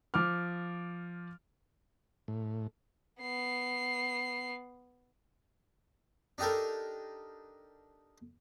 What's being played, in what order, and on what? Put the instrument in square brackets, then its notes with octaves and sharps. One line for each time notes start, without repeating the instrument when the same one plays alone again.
[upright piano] F3 D6 F6
[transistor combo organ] A2
[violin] B3 C7
[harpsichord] D4 D#4 G4 A4 A#4